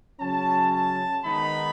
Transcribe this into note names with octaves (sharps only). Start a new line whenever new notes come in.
C#3 F#3 C#4 A5
A5
D#3 G#3 B3 D#4 B5